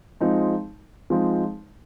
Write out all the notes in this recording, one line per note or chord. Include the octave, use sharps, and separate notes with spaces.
F3 G#3 C4 D#4
F3 G#3 C4 D#4